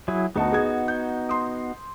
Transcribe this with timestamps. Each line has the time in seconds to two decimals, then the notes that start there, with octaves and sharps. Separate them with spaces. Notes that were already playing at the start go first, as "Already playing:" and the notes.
0.08 F#3 E4 G#4
0.36 D2 B3 D#4 F#4 D#5 A5
0.52 G#4 D#6 G#6
0.88 G6
1.29 C6 D#6